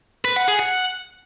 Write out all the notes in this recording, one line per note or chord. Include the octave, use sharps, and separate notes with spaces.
B4
F#5
G#4
F#5